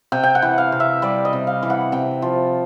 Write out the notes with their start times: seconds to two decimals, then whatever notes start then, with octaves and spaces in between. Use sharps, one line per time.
0.12 C3 G5
0.23 G5
0.35 F#5
0.42 E3
0.58 F5
0.72 C3
0.80 E5
1.02 G3 D5
1.25 D#5
1.33 C3
1.47 F5
1.63 E3
1.70 F#5
1.92 C3 G5
2.22 F3